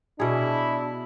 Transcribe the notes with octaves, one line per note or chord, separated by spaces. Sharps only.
B2 D4 E4 G#4